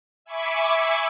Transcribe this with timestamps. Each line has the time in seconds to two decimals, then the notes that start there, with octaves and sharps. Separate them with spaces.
0.25 E5 G#5 B5 C#6 D6